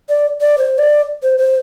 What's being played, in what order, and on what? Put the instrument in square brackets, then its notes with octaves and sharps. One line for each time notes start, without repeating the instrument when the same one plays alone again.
[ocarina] D5
D5
C5
D5
C5
C5